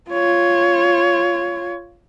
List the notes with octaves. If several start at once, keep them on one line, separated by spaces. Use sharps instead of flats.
F4 C#5